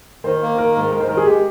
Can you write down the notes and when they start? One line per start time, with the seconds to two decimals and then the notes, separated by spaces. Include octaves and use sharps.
0.24 D#3 C5
0.42 A#3
0.58 D#3 A#4
0.76 G#2
0.91 G#3 A#4
1.00 C5
1.08 D#3 A#4
1.17 G#4
1.26 G#3 G4